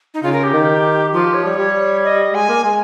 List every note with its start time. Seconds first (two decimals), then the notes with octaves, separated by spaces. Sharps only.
0.14 D#4
0.23 C#3 F4
0.33 A#4
0.43 G4
0.53 D#3
1.13 F3 F4
1.24 G4
1.34 C#5
1.44 G3
1.58 G3
2.04 D#5
2.33 G#3 G#5
2.49 A#3
2.64 G#3